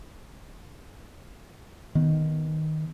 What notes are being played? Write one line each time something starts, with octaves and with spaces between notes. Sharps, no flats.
D#3 B3